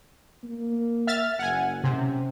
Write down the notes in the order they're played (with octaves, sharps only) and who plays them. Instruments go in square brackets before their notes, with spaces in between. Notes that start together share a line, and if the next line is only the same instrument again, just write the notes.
[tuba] A#3
[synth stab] E5 F6 A6
[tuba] F#1 [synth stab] F#5 G#5
[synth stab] C3 [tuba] C#4